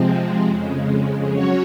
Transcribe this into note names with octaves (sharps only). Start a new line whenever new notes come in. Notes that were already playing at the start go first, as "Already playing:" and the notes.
Already playing: C3 F3 G#3 C4
F2 C#3 G#3
F#3 C#4 F#4 C#5